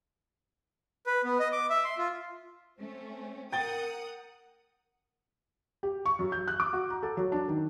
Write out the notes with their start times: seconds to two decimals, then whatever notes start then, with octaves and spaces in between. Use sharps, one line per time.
1.06 B4
1.24 B3
1.39 D#5
1.52 D6
1.70 E5
1.85 C6
1.98 F4
2.79 A3 C4 C#4
3.52 A#4 F#5 G5 D#6 A6 G7
5.83 G4
6.06 C#6
6.19 F#2
6.32 G6
6.48 F#6
6.60 D6
6.73 F#4
6.90 A#5
7.03 A4
7.17 F#3
7.32 D4
7.48 D#3